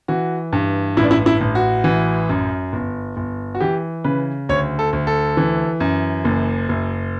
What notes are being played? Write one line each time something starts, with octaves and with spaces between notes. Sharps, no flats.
E3 F#4
G2
A1 E4
D4
E4
E4
A1
F#4
E3
F#2
G1
G1
F#4
E3 G4
C#3 B4
D2 C#5
A4
D2
A4
E3
F#2
F#1
F#1